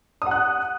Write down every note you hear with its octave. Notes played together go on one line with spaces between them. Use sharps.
F#5 D#6 F#6